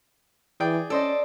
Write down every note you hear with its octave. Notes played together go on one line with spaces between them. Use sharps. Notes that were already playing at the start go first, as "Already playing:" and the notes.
E3 G#4 D5 G5
C#4 A4 C5 D5 D#5